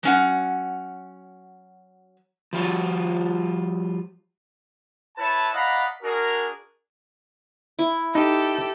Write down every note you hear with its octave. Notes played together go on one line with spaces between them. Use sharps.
F#3 C#4 F#5
F3 G3 F4 F#4
E4 B4 C#5 A5
D5 D#5 F5 F#5 A#5 B5
D4 F#4 G#4 A#4
E4
D#4 G4 A4